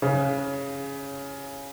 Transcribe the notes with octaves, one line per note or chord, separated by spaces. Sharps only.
C#3